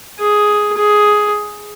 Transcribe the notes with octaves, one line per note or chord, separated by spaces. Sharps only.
G#4
G#4